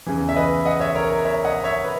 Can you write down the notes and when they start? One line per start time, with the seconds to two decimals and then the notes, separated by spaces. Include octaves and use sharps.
0.06 E2 C#3 E3
0.29 E5
0.36 B4 D#5
0.65 D#5 F#5
0.80 C#5 E5
0.95 A#4 C#5
1.10 A#4
1.25 C#5 E5
1.44 D#5 F#5
1.64 C#5 E5
1.84 B4